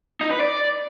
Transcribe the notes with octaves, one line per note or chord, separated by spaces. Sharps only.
D#4
B4
D5